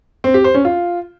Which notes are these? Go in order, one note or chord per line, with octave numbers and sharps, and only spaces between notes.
C4
G4
C5
C#4
F4